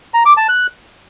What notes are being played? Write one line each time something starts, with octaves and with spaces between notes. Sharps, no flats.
A#5
D6
A5
F#6